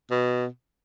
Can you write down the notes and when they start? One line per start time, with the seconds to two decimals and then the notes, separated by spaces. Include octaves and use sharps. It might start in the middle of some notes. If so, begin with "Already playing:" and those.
0.11 B2